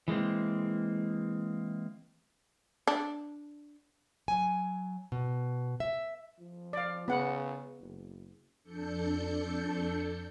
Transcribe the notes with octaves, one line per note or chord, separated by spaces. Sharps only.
E3 G#3 A#3 C4
D4
F#3 G#5
B2
E5
F3
D5 F5
C#3 B3 F#5
F#1
F2 D4 A4 G6 C#7